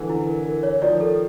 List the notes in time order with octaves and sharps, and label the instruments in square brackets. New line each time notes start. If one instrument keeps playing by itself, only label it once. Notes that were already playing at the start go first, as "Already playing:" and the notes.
Already playing: [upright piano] D3 E3
[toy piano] E4
A#4
A#4
C#5
[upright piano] D#3 F3 [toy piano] D5
[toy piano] A4